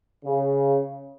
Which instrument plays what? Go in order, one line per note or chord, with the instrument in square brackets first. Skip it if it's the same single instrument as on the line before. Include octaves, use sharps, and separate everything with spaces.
[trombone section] C#3